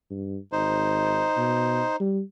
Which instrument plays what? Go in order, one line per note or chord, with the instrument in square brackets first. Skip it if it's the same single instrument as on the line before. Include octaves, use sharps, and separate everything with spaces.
[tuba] G2
[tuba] G#1 [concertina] D#4 C5
[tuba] B2
G3